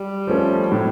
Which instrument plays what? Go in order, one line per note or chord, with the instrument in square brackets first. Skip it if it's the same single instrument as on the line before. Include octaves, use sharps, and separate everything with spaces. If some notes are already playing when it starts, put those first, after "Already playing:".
Already playing: [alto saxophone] G3
[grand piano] F3 A3 C#4
[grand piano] A2 [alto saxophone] F#3